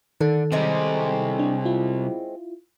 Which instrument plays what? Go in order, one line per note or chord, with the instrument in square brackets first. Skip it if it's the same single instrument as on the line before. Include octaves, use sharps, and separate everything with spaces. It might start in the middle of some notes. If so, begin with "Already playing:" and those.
[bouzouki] D3 [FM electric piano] D#3 A4
[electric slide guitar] C3 G3 [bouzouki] G#3 C4 C#4
[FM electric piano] D4
E4 F4